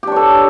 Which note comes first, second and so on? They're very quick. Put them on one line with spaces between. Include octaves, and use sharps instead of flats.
G4 D4 C#5 A4